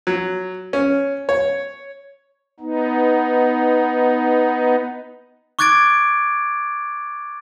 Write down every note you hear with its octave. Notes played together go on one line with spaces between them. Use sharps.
F#3
C#4
C#5
B3 D#4
C#6 D6 F#6 G#6 A6 D7